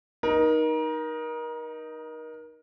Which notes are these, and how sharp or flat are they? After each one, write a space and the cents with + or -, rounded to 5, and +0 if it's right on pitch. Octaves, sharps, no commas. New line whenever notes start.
D#4 +0 A#4 +30